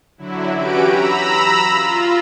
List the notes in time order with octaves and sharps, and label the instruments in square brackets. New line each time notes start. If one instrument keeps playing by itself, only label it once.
[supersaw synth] D3 F#3 E4
E3 C#4 F#4 G4 B4 D7
A#5 B5 E6
F4